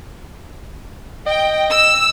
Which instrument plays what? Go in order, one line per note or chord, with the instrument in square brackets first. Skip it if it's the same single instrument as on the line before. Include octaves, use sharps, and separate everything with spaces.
[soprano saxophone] D#5 [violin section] G5
[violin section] E6